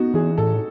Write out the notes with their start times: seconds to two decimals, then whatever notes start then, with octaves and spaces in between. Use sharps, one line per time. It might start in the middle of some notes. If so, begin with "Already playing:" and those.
Already playing: B3 D#4 F#4
0.14 E3 G#4
0.38 A2 A4